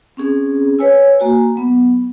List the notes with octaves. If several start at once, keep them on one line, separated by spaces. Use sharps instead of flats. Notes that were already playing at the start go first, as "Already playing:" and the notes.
C4 C#4 G#4
B4 C#5 G#5 E6
A#3 F#4 G#5
F#3 B3